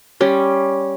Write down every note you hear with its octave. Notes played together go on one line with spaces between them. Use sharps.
G3 C#4 C6